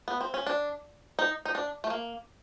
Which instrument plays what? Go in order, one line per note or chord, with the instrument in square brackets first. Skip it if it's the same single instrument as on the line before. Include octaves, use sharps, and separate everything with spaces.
[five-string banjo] B3
C4
C#4
D4
D#4
D#4
D4
A3
A#3